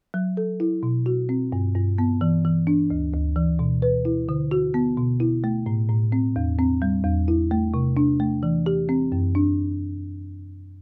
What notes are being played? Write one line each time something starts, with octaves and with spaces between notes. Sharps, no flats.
F#3
A4
E4
B2
F#4
C4
G2
G2
B3
E3
E3
D4
D2
D2
E3
B2
B4
E4
D3
F#4
B3
B2
E4
A3
A2
A2
C4
E2
C4
G3
E2
E4
A3
C3
D4
A3
E3
G4
C4
F#2
D4